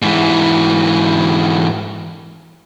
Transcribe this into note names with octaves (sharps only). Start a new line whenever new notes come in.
G#2 E3